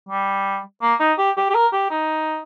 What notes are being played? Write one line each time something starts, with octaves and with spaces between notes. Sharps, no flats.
G3
A#3
D#4
G4
G4
G4
A#4
G4
D#4